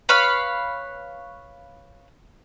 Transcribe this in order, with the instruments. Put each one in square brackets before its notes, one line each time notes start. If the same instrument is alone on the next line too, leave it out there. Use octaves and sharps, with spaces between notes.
[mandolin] B4 C#5 F5 B5